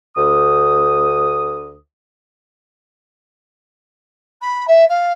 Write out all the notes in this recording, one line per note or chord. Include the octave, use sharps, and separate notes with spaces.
D2 D#6
B5
E5
F5